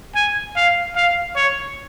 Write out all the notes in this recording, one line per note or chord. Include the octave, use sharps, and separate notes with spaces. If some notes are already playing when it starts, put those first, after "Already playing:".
G#5
F5
F5
C#5